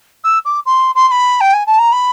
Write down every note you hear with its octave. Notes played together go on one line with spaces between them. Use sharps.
E6
D6
C6
C6
C6
B5
G5
G#5
A5
A#5
B5